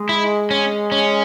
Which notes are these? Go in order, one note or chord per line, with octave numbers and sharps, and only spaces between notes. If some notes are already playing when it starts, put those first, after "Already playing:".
Already playing: G#3
E4
C#4
C#4